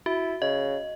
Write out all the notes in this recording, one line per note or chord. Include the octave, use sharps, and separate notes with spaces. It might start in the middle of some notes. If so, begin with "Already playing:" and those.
E4 F#4
C#3 D#5